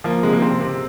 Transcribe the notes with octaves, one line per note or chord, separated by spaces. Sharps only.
F3 A#3
C3 G#3
A#3
C3 C4
C3